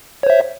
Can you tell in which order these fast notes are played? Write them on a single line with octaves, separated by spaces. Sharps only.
C#5 C5 E5